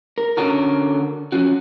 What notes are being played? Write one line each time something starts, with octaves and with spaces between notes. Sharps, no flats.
A#4
D3 C#4 F#4 A4 A#4
F3 C#4 F#4